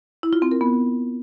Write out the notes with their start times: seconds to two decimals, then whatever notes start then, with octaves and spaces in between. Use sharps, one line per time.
0.23 E4
0.33 F4
0.42 C4
0.51 A#4
0.61 B3